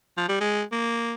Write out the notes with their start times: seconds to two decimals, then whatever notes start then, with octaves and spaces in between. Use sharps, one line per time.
0.18 F3
0.29 G3
0.41 G#3
0.72 A#3